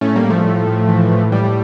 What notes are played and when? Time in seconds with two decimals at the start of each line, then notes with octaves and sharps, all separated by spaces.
0.01 A2 A3 C#4
0.16 G3 A#3
0.23 A2
0.30 F3 A3
0.44 A2
0.67 A2
0.89 E3
1.11 A2
1.32 A2 G3